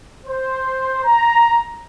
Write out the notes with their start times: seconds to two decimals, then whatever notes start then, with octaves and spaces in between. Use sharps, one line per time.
0.25 C5
1.05 A#5